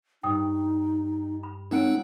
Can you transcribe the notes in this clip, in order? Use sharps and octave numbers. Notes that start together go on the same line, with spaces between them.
G2 D#4 G5 D#6
B5
G#3 C4 D#4 A#4 C#5 F#5 D7